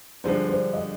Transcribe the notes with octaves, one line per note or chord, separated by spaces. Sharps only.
G2 D3 F3 G#3 C5
C5
D#5